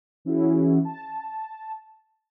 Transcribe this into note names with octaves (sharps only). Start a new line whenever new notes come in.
E3 C#4 E4 F#4 G#4
A5